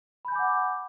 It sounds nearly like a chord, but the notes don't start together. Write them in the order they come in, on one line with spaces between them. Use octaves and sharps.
B5 G6 G#5 D6 F#5